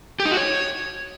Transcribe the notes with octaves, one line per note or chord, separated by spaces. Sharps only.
G4
D#4
F#4
C#5